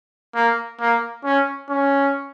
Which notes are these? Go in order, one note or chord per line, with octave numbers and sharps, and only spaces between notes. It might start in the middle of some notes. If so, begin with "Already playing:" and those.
A#3
A#3
C#4
C#4